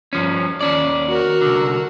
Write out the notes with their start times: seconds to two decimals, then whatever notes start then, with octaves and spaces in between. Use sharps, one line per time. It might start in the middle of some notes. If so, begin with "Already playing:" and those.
0.13 G2 F3 C#4
0.61 D#2 C#4 D5
1.09 F#4 A#4
1.42 C2 D3